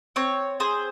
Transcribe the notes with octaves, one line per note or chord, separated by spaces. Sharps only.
C4 C#5
G#4 C5